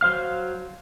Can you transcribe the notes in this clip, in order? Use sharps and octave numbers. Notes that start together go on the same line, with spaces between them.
F#3 C5 F5 F6